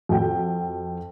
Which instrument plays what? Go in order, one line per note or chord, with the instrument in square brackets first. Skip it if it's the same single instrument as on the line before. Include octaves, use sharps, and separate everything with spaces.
[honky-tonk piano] F2 F#4 G5